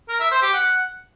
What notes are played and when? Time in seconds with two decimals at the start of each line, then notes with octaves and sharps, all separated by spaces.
0.09 A#4
0.20 E5
0.31 C5
0.42 G4
0.54 F#5